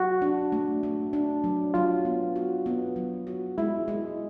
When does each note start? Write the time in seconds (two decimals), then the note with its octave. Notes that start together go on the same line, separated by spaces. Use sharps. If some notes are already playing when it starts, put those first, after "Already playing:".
Already playing: F#3 F#4
0.22 D4
0.52 A3
0.83 A3
1.13 D4
1.44 F#3
1.74 F#3 F4
2.05 B3
2.36 F#4
2.66 B3
2.96 F#3
3.27 F#4
3.58 G#3 E4
3.88 G#3